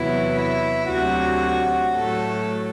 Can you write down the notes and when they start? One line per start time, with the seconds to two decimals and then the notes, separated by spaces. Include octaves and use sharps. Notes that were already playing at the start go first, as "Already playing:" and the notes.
Already playing: E2 C3 F#3 B3 E4
0.36 E4
0.89 D2 C3 F#3 F#4
1.94 A2 F#3 A3 A4